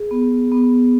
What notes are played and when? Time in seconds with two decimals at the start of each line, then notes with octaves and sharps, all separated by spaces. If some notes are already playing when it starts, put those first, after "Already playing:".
Already playing: G#4
0.11 B3
0.52 B3